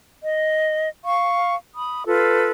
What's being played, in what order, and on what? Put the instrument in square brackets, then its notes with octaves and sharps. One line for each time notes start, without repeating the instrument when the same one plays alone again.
[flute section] D#5
F5 C#6
B5 D#6
F4 A4 B4